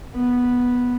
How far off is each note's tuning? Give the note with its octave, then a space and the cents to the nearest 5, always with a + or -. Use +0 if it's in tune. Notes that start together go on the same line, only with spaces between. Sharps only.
B3 -5